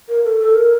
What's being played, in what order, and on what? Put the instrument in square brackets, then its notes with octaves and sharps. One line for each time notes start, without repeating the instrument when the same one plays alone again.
[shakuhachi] A#4
A4
A4
A#4